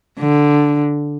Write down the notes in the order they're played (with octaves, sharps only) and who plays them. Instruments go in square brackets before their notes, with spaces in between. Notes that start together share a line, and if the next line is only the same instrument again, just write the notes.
[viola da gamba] D3